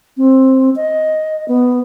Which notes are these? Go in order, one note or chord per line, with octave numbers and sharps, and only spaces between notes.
C4
D#5
B3